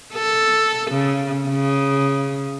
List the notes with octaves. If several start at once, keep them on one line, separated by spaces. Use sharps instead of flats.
A4
C#3
C#3